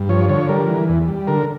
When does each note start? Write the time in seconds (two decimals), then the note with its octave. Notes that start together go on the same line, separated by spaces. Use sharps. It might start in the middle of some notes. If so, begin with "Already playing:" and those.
Already playing: G2
0.09 F3 C#5
0.29 D3 C#5
0.49 G3 A#4
0.69 E3
0.89 E2
1.08 G3
1.27 D3 A#4